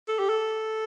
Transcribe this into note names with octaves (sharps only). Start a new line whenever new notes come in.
A4
G4
A4